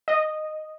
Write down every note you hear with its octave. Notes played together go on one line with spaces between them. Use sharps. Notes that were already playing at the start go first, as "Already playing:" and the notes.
D#5